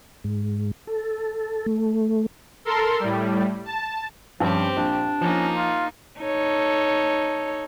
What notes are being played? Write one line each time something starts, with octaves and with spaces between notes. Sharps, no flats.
G#2
A4
A3
A4 A#4 C6
A2 G3
A5
G2 F3 C4 C#4 G4
A#1 D4
F3 A#3 C#4 D#4
F4
D#4 A4 C#5